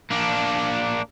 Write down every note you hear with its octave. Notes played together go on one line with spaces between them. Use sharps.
A#3 D4